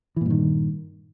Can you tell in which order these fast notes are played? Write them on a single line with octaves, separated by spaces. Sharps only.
E3 A#2 G2 D#3